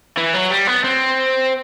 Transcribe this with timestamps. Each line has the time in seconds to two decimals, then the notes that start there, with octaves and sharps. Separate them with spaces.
0.18 E3
0.34 F#3
0.51 G3
0.67 B3
0.84 C4